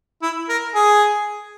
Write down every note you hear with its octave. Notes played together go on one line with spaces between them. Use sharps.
E4
A#4
G#4